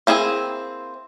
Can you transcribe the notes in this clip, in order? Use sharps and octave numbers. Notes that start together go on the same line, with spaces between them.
A#3 C4 E4 G#4